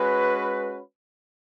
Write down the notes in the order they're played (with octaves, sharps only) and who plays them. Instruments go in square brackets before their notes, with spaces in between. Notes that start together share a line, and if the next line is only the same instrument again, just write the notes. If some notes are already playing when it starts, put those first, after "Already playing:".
Already playing: [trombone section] G#3 C#4 F#4 B4